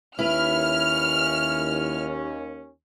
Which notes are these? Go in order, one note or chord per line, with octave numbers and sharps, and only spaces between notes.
D#2 C#4 E4 B4 F6